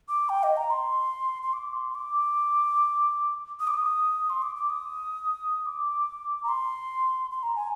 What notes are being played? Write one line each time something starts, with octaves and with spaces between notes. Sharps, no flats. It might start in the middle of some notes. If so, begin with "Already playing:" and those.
D6
G5
D#5
A#5
C6
C6
D6
C6
D6
D#6
D6
D#6
C6
D6
D6
D#6
D6
A#5
C6
C6
A#5
G#5